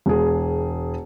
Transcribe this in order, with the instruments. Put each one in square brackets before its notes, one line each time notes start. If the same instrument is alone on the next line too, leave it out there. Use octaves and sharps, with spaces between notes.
[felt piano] E1 G#4